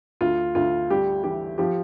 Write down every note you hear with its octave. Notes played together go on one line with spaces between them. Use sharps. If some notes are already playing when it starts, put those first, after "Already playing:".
D2 F4
D2 F4
G3 G4
E3 G4
F3 G4